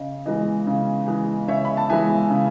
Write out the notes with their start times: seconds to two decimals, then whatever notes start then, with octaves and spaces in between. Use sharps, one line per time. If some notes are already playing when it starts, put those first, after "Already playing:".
Already playing: C#3 D#5
0.26 E3 G#3 D#5
0.67 C#3
1.07 E3 G#3
1.48 C#3 C#5 E5
1.65 B5
1.77 A5
1.89 E3 G#3 E5 G#5
2.30 C#3